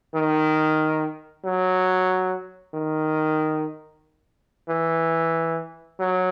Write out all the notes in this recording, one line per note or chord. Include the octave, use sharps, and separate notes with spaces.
D#3
F#3
D#3
E3
F#3